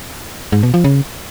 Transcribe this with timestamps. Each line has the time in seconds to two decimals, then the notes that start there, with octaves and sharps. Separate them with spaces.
0.52 G#2
0.63 B2
0.74 F3
0.84 C#3